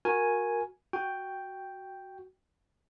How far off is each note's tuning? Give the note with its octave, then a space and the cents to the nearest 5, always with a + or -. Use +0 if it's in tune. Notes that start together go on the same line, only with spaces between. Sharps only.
F#4 -15 A#4 +0 G#5 +0
F#4 +5 G5 +0